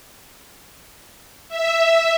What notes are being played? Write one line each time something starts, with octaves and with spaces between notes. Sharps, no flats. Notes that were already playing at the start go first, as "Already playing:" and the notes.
E5